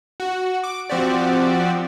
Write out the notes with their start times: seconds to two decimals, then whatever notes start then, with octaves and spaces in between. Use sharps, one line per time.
0.20 F#4
0.64 D6
0.90 F3 C4 F#4 G4 D5